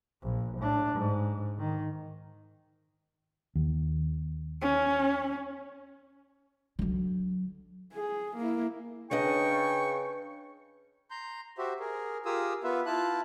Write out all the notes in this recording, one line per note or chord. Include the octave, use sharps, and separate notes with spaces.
A#1
A2 D4
G#2
D#3
D#2
C#4
D3 F#3
G#4
A#3 E4
C#3 D4 B4 D#5 G5 C#6
A#5 C6 G6
F#4 G4 C5 E5
G#4 A#4
F4 G4 G#4 A#4 D#6 E6
B3 F4 B4 E5
E4 F4 A5 F#6